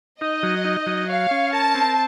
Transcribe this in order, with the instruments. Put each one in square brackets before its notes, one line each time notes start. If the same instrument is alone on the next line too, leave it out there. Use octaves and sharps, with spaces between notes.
[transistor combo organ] D#4 [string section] D#5
[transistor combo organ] F#3
D#4
F#3
[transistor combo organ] C#5 [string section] F5
[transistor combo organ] C#4
[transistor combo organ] A#4 [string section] A5
[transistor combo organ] C4